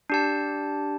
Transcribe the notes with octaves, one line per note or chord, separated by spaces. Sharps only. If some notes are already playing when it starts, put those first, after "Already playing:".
D4 G4 A5